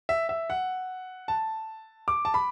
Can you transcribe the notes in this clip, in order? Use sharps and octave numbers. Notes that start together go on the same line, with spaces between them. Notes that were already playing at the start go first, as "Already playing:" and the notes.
E5
E5
F#5
A5
D6
A5
B5